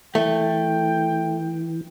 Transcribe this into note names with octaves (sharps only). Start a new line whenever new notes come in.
E3 A3 G5